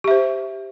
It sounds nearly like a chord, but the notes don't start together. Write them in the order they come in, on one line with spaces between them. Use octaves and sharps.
G4 E5 C5